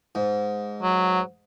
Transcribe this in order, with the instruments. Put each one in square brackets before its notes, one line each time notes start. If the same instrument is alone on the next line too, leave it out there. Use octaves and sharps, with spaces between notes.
[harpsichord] G#2
[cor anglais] F#3